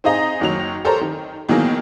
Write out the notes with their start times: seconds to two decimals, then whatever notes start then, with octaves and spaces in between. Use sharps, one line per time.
0.04 C4 D#4 G#4 D#5 A#5
0.40 F#1 D#3 F#3 F7
0.85 G4 A4 A#4 C5 C#5 A#5
1.01 D#3
1.49 B2 D#3 E3 F#3 A#3 G#4